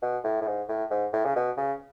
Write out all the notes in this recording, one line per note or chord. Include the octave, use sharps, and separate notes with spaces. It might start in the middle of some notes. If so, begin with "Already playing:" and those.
B2
A2
A2
G#2
A2
G#2
A2
C#3
B2
C#3